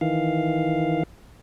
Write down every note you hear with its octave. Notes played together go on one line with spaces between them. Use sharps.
D#3 E3 F5